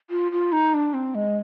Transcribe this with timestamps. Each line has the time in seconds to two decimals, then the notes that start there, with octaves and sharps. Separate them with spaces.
0.10 F4
0.32 F4
0.52 D#4
0.74 D4
0.94 C4
1.15 G#3